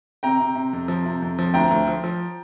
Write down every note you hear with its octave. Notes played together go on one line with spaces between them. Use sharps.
C3 G5 A#5
C3
C3
F2
F3
C3
F2
F3
D2 G5 A#5
D2
F3
F3